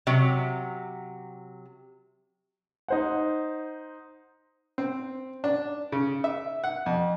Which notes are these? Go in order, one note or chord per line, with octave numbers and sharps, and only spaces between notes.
C3 F#3
D#4 C5 F#5
C4
D4
C#3
E5
F#5
F2